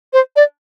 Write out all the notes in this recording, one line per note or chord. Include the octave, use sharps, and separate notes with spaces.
C5
D5